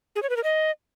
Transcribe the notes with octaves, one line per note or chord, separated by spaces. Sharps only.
G#4
C#5
B4
A#4
D#5